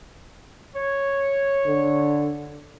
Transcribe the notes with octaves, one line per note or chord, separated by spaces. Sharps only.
C#5
D3